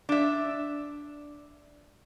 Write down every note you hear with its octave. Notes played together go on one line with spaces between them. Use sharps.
D4 E5